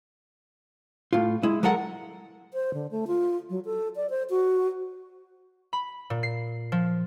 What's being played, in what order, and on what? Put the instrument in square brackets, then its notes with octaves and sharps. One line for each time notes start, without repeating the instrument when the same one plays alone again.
[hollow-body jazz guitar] A2 F4
G#3 E4
F#3 G#3 A4 A#4 F#5
[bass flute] C5
D3
A3
F4
F#3
A4
D5
C5
F#4
[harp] B5
A#2
C7
F3